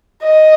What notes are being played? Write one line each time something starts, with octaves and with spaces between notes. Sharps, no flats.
D#5